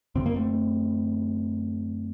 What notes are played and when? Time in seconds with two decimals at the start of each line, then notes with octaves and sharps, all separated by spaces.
0.15 F#2 D3 C4
0.26 A#3
0.36 A3 C4